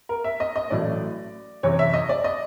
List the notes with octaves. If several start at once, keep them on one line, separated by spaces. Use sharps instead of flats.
A#4
E5
D#5
D#5
A1 A2 F#3 A3 D5
F#1 E2 C3 C#5
E5
D#5
D5
D#5